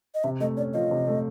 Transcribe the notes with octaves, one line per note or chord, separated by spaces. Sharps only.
D#5
C3 E5
A3 D#5
C#4 D5
F3 D#5
C3
A3